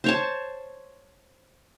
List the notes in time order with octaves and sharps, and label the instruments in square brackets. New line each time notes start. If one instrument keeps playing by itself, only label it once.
[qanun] C5 C#5 A5